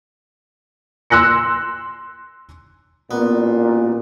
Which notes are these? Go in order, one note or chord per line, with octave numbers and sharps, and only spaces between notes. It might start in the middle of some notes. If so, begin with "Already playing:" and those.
C6 E6 F#6 A#6 C#7
A1 A#2 B3